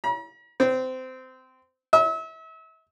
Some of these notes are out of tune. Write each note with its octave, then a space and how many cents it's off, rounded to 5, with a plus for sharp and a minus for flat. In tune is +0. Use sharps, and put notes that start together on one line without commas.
A#5 +45
C4 -20
E5 -35